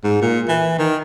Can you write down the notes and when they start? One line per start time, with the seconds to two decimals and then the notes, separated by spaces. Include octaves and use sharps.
0.04 G#2
0.22 A#2
0.48 E3
0.79 D#3